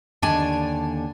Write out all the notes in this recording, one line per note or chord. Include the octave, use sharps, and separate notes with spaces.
D#2 D3 D4 D5 G#5 A5